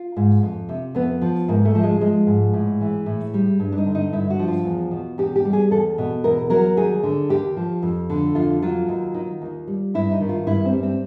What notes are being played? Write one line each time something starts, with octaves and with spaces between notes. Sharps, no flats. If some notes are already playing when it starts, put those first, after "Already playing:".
Already playing: F4
G#2
F2
C3
F2 B3
F3
G#2 A#3
A3
F3
G#3
F3 G#3
G#2
A2
E3
A2
G3
G2
D4
D#4
D3
D#4
G2 E4
F#4
F3
F4
E2
B2
E2 G4
G4
G3
G#4
E2 A4
B2
E2 A#4
F#3 A#4
D#2 G#4
D3
D#2 G4
F3
F2
D3
F2 F4
F#3 F4
D#2
D#3
D#2
G3
G2 E4
D#4
D#3
F4
G2 E4
C4
G3
C4